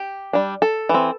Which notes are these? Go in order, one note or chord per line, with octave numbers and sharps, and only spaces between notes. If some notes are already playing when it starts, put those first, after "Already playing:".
Already playing: G4
G3 D4
A4
E3 C4